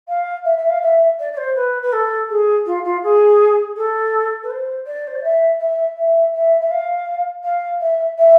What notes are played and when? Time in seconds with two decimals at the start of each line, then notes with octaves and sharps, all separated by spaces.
0.08 F5
0.45 E5
0.57 E5
0.69 F5
0.82 E5
1.19 D5
1.33 D5
1.37 C5
1.55 B4
1.82 B4
1.92 A4
2.29 G#4
2.66 F4
2.84 F4
3.03 G#4
3.76 A4
4.43 B4
4.50 C5
4.86 D5
5.07 C5
5.15 D5
5.23 E5
5.60 E5
5.97 E5
6.33 E5
6.61 E5
6.70 F5
7.44 F5
7.81 E5
8.18 E5